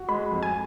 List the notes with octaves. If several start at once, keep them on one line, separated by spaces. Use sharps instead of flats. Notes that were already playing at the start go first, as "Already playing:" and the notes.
Already playing: F#4
G#3 B5
F2
G#5